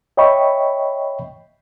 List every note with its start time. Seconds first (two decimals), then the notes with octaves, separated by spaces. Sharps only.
0.17 C#5 D#5 E5 G5 B5 C#6